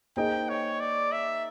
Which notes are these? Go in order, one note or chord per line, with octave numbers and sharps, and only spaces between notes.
A#3 D#4 G#4 C5 D#5 G5
C#5
D5
E5